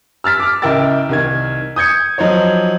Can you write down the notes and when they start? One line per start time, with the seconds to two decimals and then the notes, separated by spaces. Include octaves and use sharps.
0.24 E6 F6 A6 B6
0.40 D6 F6
0.62 C#2 E4 A#4 G5 E6 A6
1.09 C2 D#3 G#6
1.76 D#6 G6 G#6 C#7
2.18 F3 F#3 D#4 C5 C#5